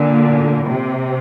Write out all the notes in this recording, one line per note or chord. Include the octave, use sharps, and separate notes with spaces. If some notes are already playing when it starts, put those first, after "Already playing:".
Already playing: A#2 D3
C3